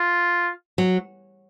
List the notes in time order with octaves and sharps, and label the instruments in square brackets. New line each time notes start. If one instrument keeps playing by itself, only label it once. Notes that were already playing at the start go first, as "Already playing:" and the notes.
Already playing: [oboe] F4
[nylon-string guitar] F#3